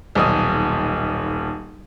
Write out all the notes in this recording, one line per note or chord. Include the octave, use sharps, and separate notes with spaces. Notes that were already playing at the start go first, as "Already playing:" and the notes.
D#1 B1 D#6